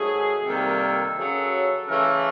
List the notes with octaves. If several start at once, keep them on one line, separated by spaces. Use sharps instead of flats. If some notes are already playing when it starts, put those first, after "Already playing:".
Already playing: G#2 D#3 F#3 A3 G#4
C3 D#3 G3 A#3 A4
F#2 C#3 F#3
C#3 E3 A3 A#4